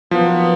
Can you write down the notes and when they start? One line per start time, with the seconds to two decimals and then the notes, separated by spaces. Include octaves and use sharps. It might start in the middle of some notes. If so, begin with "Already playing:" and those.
0.11 A#2 F3 F#3 B3 D#4